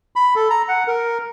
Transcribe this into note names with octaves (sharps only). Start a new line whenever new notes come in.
B5
A4
A#5
F#5
A#4